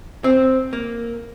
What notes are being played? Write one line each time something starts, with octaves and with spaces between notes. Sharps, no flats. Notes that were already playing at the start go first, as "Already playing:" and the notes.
C4
A#3